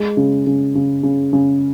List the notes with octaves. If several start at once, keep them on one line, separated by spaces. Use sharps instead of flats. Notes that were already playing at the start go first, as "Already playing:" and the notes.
Already playing: G#3
C#3
C#3
C#3
C#3
C#3